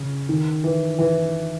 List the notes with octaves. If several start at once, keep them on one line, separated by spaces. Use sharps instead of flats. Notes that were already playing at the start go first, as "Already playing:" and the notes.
Already playing: C#3
D#3
E3
E3